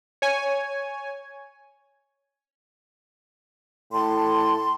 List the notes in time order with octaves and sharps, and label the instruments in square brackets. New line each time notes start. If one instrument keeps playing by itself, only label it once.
[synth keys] C#5 G#5
[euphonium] A2 [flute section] A5 C6